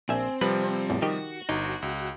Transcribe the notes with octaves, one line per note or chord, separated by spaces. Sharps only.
A#1 C4 E5 G#5
C3 F3 G3 B4
A1 E2
D#3 F#4 G4 D#5
G1 D#4
C#2